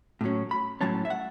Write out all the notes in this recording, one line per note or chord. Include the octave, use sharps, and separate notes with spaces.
A2 F#3 C#4
B5
A2 F#3 C#4 A5
E5
F#5